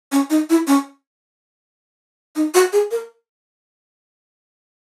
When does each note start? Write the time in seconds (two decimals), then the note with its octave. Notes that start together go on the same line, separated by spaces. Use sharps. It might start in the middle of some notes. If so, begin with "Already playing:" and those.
0.12 C#4
0.30 D#4
0.50 E4
0.67 C#4
2.36 D#4
2.54 F#4
2.72 G#4
2.91 A#4